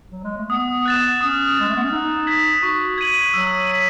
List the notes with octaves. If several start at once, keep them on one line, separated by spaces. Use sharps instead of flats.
F#3
G#3
A3
B3 D#6
F#6 A6 E7
C#4 D#6
G#3 A6 E7
A3
B3
C#4
D#4 E6
G#6 B6 F#7
F#4 C#6
G#6 D#7 F#7
F#3 E6
B6 D#7